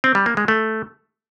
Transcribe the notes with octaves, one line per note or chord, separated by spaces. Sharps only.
C4
G3
A#3
G#3
A3